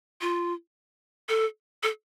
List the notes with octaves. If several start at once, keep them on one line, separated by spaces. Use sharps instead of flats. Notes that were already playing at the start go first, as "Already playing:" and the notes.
F4
A4
A4